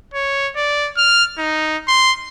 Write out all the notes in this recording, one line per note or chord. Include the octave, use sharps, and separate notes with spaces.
C#5
D5
F6
D#4
C6